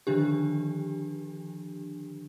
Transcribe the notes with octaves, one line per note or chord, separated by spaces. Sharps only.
D3 D#3 F3 D4 G4